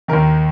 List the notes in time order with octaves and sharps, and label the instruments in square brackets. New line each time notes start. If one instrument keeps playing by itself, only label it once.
[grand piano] D#2 D#3 A#4